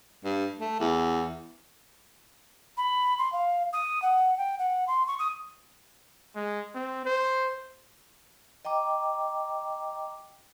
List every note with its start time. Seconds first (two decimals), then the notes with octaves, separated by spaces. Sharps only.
0.24 G2
0.59 A3
0.80 E2
2.77 B5
3.18 C6
3.32 F5
3.73 D#6
4.02 F#5
4.37 G5
4.58 F#5
4.87 C6
5.07 C#6
5.19 D#6
6.36 G#3
6.75 C4
7.06 C5
8.65 D#5 G5 A#5 D6